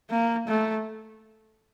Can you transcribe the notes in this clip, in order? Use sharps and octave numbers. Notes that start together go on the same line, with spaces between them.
A#3
A3